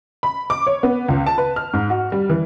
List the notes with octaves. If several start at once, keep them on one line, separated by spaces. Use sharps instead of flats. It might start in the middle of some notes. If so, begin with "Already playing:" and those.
B5
D6
C#5
B3
C#2
A5
B4
F6
G#2
F#4
G3
E3